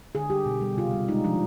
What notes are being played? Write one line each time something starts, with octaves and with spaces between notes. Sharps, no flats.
D3 G#4
G3 G4
B2
G3
C3 F4
G3
G#3 D#4
F3 D4